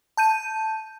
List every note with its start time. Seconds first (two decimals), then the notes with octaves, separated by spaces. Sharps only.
0.17 A5 G6 D#7